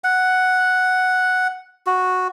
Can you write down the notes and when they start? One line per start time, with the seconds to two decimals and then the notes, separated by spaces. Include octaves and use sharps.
0.04 F#5
1.87 F#4